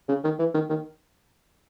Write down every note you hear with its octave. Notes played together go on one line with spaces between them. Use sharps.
C#3
D#3
E3
D#3
D#3